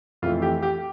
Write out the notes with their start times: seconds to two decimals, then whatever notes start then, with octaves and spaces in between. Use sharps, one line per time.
0.22 F2 E3 A3 F4
0.42 G4
0.63 G4